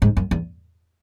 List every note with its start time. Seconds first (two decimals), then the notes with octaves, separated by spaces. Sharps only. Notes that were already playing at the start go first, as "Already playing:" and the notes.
0.02 G#2
0.17 F#2
0.31 E2